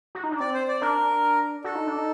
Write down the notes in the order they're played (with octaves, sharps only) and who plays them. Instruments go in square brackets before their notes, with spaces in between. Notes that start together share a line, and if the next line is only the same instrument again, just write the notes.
[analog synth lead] F#4
D#4
D4
[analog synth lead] C4 [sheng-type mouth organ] D5
[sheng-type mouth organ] C5
D5
[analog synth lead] D4 [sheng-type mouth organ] A#4
[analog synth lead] F#4 [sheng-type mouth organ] A4
[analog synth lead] D#4
D4
D#4